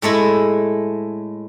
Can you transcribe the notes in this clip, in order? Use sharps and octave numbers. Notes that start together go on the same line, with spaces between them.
A2 G#3 A3 E4